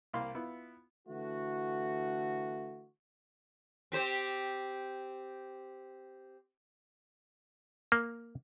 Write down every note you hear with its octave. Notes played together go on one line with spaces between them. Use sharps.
C2 A#3 F5 B5 C6
B3 E4 F4
D3 E3 A3 F#4
C4 G4 C5
A#3